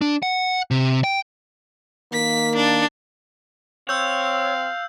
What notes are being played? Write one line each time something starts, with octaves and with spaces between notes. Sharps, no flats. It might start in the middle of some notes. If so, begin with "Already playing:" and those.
D4
F#5
C3
G5
D#3 A#3 B6
D4
C4 C#5 F5 E6 G6